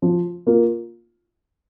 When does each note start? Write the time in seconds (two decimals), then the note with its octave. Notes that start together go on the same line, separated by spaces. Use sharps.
0.02 F3
0.47 A#3 F4